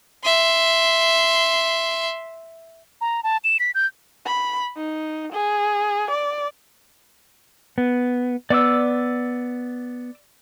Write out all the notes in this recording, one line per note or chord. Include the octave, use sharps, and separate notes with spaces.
E5 C6
A#5
A5
E7
B6
G6
B5
D#4
G#4
D5
B3
B3 D5 D6 E6